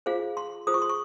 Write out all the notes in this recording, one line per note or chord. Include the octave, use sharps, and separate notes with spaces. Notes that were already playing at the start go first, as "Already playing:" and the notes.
F4 G#4 C5 F5
C6
F4 G#4 C5 D#6
C#6
C6
C#6